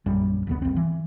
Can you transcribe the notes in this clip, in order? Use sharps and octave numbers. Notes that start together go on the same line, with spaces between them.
A#1 F#2 G3
E1 D2 B3
G1 C4
E3